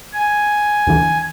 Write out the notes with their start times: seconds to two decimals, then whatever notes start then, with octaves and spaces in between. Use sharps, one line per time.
0.13 G#5
0.87 D#2 D3 E3